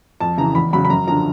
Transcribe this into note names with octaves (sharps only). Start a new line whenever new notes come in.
F2 A5
C#3 E3 A#5
E2 B5
C#3 F#3 B5
B5
F#2 A#5
D3 F3 A#5